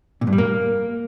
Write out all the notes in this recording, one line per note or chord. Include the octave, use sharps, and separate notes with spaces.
A#2
G2
G3
A#3